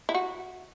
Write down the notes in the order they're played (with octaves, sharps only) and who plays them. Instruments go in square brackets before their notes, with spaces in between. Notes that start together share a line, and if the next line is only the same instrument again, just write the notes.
[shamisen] E4
F#4